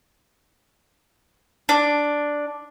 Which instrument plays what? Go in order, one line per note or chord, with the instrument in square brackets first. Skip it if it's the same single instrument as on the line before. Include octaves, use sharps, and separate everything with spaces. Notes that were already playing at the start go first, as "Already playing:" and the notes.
[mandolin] D4